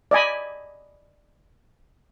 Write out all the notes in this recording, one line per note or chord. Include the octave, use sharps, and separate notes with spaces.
D5 D#5 G#5 B5